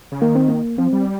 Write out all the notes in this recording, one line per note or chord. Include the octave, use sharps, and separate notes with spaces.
C#3
D#3 A#3
C4
A#3
F3 C4
G3